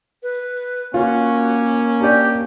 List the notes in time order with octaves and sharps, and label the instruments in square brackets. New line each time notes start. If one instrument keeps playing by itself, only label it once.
[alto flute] B4
[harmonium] A#3 [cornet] C#4 [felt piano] F4 [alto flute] F#4
[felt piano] D4 D5 [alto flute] G4